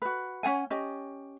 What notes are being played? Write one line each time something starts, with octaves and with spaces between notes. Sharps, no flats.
F#4 B4
C#4 D4 F#5 G#5
C#4 G4 D#5